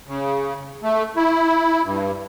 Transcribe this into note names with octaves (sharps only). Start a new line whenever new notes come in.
C#3
A3
E4
G2